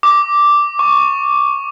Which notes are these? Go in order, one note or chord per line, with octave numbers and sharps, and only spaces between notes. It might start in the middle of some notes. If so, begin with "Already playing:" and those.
D6
C#6